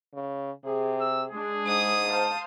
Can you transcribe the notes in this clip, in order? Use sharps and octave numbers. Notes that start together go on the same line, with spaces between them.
C#3
C3 G#4
E6
G#3 D4 G#4
G#2 D#6
C5 F5 A5